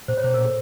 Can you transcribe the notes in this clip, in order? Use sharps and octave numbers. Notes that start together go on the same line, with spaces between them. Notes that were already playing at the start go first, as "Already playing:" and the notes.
A#2 C5
C#5
B2 C5
A#4
A#2
A4